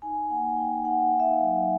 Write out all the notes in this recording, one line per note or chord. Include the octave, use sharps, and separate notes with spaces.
D#4 G#5
A#3 F#5
D#4 G5
D#4 F#5
D#4
E5
F5
F#3